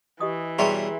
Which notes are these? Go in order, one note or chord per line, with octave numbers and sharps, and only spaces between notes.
E3 G4 D#5 D#6
B2 G3 G#4 C#5 E5 G5 A#5 C6